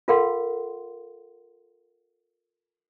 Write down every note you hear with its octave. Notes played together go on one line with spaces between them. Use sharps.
F4 A4 A#4 F5 F#5 C6